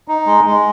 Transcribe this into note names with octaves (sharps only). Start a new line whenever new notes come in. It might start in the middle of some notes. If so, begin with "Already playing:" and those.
D#4
G#3
G#3